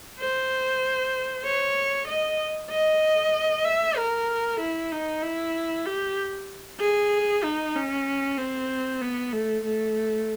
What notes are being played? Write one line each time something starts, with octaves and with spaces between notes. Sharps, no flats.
C5
C#5
D#5
D#5
E5
A#4
E4
D#4
E4
G4
G#4
D#4
C#4
C4
B3
A3
A3